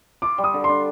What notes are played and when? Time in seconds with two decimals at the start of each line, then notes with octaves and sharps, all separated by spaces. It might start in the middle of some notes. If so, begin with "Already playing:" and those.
0.22 F4 D6
0.38 G3
0.44 D#6
0.54 D3
0.64 D4 C6